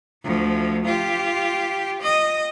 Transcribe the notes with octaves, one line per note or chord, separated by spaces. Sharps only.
D2 F3
F4 G4
D#5